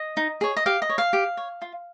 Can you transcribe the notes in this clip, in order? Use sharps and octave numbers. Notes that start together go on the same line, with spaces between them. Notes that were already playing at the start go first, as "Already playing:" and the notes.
Already playing: D#5
D#4
G#4 C#5
D#5
G4 F5
D#5
C#5
F5
G4
C#5
F4